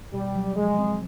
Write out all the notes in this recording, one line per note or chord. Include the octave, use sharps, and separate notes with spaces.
B2 G3
F#3
F3 G#3
C4